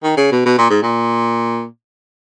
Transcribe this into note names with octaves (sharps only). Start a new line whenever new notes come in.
D#3
C#3
B2
B2
A#2
G#2
A#2